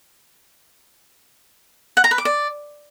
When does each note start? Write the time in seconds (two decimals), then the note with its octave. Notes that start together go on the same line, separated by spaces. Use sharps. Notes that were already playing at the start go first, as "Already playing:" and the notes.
1.97 F#5
2.04 A#5
2.11 B4
2.18 D6
2.25 D5